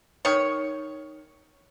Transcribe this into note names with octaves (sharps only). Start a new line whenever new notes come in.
D#3 C#5